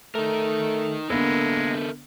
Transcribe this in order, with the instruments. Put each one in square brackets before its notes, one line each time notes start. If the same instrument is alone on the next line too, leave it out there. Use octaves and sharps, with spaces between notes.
[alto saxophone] A3 [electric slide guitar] D#4 A#4
[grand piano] D3 B3 [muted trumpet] G#3 [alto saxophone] A#3 [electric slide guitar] A4 A#4 E5